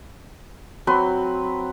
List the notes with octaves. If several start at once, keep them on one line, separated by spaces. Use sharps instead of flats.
F#3 C4 B4 C6